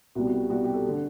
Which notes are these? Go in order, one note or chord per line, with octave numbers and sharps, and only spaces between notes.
C2 B2 G3 F#4
F#4
G4
C2 B2 G3 F#4
G4
A4
D3